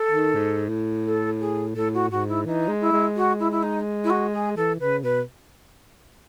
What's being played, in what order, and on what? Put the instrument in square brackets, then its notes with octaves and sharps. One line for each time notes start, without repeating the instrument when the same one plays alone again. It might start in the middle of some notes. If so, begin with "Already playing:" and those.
Already playing: [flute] A4
[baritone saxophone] D#3
G#2
A2
[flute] A4
G#4
[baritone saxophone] A2 [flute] A4
[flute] F#4
[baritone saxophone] G#2 [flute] F#4
[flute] E4
[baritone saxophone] E3 [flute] D#4
[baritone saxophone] G#3
[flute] E4
[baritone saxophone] G#3
[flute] F#4
E4
E4
D#4
E4
F#4
G#4
[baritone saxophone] E3 [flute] A4
[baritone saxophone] C#3 [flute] B4
[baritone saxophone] B2 [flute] B4